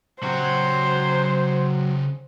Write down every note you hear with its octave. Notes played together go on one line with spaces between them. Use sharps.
C#3 F#3 F#4 G4 C5